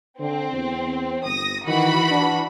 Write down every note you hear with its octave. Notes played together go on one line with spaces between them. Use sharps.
D3 C4
E2
G1 D#6 A#6
D#3 E3 F#4 B5
D4